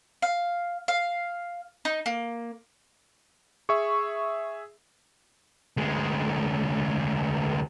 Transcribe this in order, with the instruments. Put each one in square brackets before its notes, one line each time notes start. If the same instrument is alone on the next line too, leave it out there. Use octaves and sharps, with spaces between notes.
[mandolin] F5
F5
D#4
A#3
[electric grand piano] G#4 E5 [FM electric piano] C#6
[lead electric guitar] D2 G#3